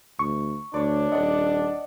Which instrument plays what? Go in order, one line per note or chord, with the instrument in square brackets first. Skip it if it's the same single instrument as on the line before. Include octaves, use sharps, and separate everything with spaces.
[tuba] D2 [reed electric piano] C#6
[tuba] D2 [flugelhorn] D4 [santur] C#5 D5
[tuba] D#1 [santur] D5 F#5 [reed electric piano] D#5